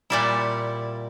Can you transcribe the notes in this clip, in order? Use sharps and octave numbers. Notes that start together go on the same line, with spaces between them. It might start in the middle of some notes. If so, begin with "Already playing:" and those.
A#2 G3 E4